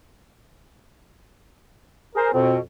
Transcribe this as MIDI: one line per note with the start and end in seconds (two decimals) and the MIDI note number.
2.15 2.28 68
2.15 2.31 70
2.15 2.28 72
2.33 2.58 41
2.33 2.58 47
2.33 2.55 60